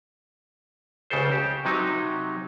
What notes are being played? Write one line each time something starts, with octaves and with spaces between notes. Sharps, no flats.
C#2 C#3 G4 A4 C5
G4
C3 F#3 D#4